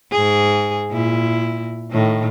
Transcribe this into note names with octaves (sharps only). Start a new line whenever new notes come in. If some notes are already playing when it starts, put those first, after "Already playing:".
G#2 G#4
A#2 E4
A2 D#3